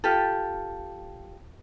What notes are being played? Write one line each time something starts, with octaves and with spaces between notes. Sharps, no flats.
F4 G4 A4